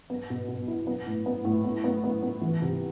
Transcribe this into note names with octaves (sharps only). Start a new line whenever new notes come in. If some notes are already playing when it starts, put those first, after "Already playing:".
B3
B2
B2
E4
B3
A2
B3
A2
B3
B3
B3
B3
E3
C3